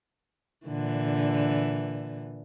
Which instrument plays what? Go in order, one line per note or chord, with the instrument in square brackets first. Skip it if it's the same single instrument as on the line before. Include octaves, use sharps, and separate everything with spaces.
[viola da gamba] A#2 D3 E3